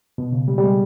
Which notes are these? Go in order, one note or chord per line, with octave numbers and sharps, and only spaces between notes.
B2
C#3
G3
G3
G#3